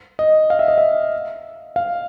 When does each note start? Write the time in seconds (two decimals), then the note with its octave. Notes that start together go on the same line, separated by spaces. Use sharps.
0.19 D#5
0.50 F5
0.59 E5
0.68 D#5
0.78 E5
1.76 F5